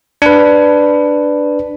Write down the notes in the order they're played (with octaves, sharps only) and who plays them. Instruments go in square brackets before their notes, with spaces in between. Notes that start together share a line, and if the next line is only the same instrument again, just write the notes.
[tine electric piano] D4 B4